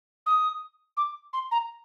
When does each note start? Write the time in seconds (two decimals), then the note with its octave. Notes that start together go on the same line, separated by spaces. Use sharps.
0.26 D#6
0.97 D6
1.33 C6
1.51 A#5